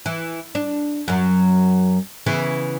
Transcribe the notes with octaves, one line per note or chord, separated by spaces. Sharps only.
E3
D4
F#2 F#3
C#3 E3 B3